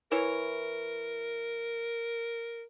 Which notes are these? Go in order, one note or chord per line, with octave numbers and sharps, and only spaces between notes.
E3 E4 A#4 C#5